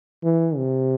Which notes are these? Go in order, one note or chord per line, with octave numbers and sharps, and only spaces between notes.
E3
C3